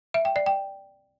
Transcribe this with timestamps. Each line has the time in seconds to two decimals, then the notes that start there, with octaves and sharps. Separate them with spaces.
0.14 E5
0.25 G5
0.36 D5
0.46 G5